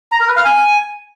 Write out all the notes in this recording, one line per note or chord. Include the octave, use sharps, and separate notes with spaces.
A#5
A#4
B4
F5
G#5